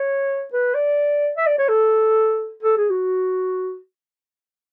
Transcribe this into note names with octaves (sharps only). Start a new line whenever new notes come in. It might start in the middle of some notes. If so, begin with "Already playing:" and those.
Already playing: C#5
B4
D5
E5
D5
C#5
A4
A4
G#4
F#4